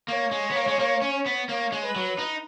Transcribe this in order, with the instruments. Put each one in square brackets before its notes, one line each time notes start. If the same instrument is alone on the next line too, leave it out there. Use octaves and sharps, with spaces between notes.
[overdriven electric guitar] A#3 [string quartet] C#5
[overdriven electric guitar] G#3
B3
A#3
G#3
A#3
C#4
B3
[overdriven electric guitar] A#3 [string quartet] C#5
[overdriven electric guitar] G#3
[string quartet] B4
[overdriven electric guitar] F#3
D#4